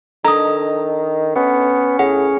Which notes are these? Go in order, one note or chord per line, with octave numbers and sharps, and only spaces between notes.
D#3 D4 A4 D#5 A#5 D#6
B3 C#4
A2 G#4 F#5